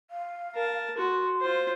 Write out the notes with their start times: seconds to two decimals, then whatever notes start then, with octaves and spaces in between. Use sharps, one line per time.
0.10 F5
0.55 A#4 A5
0.97 F#4 C6
1.41 F4 C5